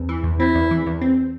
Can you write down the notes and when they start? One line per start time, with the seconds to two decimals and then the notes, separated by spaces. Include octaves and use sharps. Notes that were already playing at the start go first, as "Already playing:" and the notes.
Already playing: E2 C4
0.09 E3
0.23 E2
0.39 C4 E4
0.55 E2
0.71 E3
0.86 E2
1.01 C4